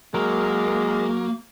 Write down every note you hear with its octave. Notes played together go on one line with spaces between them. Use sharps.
F#3 G#3 A#3 A#4